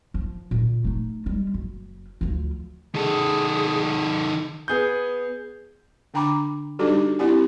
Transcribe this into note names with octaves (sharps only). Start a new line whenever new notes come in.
F3
A#2 D3
A3 D#4
G3 G#3
F#1
D2 F3
D#3 G#4 A4
B3 G#4 G6
D3 D4 G5 A#5 B5 D6
G3 D4 D#4 F#4 G4 A4
C4 E4 G4 D5 G#5